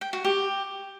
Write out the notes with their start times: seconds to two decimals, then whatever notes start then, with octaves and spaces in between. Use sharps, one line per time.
0.01 G5
0.13 F#4
0.25 G4